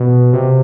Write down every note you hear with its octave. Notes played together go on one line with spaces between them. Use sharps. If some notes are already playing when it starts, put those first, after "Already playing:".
Already playing: B2
C3